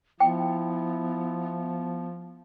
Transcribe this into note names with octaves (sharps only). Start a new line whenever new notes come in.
F3 B3 E4 G5